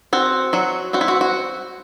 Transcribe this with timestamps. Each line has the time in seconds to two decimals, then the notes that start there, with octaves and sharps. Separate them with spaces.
0.13 C4 F#4
0.53 F#3 F#4
0.93 C4 F#4
1.01 E4
1.08 F#4
1.21 F#4